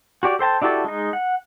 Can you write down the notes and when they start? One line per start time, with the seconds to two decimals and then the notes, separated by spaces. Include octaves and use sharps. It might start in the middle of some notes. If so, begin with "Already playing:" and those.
0.23 F#4 G4 D5
0.39 A4 C5 G5 A5
0.62 D4 E4 F#4 G4 A4
0.84 G#3 D#4
1.13 F#5